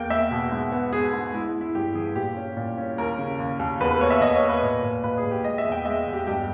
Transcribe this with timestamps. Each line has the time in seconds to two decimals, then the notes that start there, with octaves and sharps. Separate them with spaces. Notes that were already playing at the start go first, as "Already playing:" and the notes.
Already playing: E2 A#3 G5
0.10 A#3 E5
0.31 B2
0.51 G#2
0.72 B3
0.93 B3 G#4
1.13 G#2
1.33 G#3 E4
1.54 G#3
1.61 E4
1.75 G2 G4
1.95 E3 G#4
2.16 A#2 G4
2.36 C#4
2.57 A#2
2.77 C#4
2.98 D#2 A#4
3.18 C#3
3.39 D#2
3.59 D#2
3.80 E2 B4
3.91 B4
4.01 A#3 C#5
4.10 E5
4.21 E2 D#5
4.35 C#5
4.41 A#3
4.49 B4
4.63 A#2
4.83 A#2
5.03 A#2 B4
5.17 G#4
5.24 A#2
5.31 G4
5.44 G#3 D#5
5.58 E5
5.65 E2
5.72 G5
5.85 G#3 E5
6.07 E2
6.13 G4
6.27 G2 G4